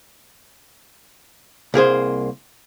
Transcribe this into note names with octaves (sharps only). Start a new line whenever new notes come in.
C2 A#3 G#4 C5